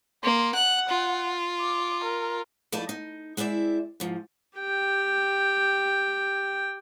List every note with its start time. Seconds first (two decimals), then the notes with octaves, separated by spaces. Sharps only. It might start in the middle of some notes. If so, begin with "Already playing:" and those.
0.24 A#3 C6
0.55 F#5 F#6
0.89 F4
1.61 D6
2.05 A#4
2.72 F2 A3 D#4 E4 D5 A5
2.89 D#4
3.37 G#3 C4 E4 D5 E5
4.00 G#2 F3
4.59 G4 G5